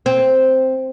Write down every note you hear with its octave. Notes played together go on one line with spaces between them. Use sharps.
C4